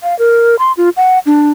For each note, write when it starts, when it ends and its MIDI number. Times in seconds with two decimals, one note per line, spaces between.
0.03 0.17 77
0.19 0.56 70
0.59 0.72 84
0.77 0.89 65
0.97 1.19 78
1.26 1.51 62